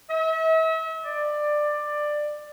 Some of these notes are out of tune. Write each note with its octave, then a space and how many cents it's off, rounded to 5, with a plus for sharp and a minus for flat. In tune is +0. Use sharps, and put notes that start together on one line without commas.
E5 -40
D5 +15